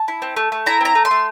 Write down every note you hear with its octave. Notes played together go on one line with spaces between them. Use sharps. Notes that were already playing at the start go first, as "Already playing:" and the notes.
Already playing: A5
E4
C4
A3
A3
E4 A#5
C4 A#5
A3
C6
A3